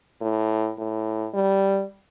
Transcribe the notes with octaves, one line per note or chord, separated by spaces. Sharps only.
A2
A2
G3